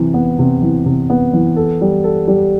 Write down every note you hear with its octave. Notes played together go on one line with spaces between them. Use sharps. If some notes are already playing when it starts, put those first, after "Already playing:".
Already playing: C3 E3
B3
C3
E3
C3
B3
E3
A4
G3
A4
G3